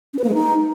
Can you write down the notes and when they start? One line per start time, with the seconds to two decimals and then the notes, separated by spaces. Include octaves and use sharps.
0.14 C#4
0.19 B4
0.24 A#3
0.29 G#3
0.34 D#4